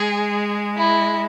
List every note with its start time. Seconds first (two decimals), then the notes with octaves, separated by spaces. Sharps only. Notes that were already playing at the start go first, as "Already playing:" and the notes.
Already playing: G#3 G#4
0.77 E4